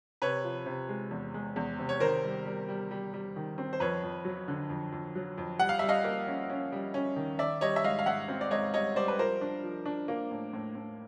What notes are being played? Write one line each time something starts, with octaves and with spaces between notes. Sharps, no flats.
C3 B4 C#5
F3
C3
G#3
E2
G#3
E2
C3
C#5
D#3 A#4 C5
G3
G3
G3
G3
G3
D#3
C4
C5
F2 B4 C#5
F2
F#3
D3
F2
F2
F#3
F2
G3 F#5
F5
G3 E5
D#5 F5
A#3
C#4
C#4
G3
C#4
D#3
D#3 D5 E5
G3 C#5 D#5
E5
G#2 D#5 F5
F5
G#2 E5 F#5
C4
D5
G#2 C#5 D#5
G3 C#5 D#5
G3 C5 D5
B4
F3 A#4 C5
D4
F3
D4
A#3
A2
A2
A2